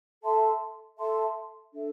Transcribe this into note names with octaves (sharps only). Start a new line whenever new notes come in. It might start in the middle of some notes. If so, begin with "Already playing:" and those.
A4 E5 A5 C6
A4 E5 A5 C6
D4 A4 E5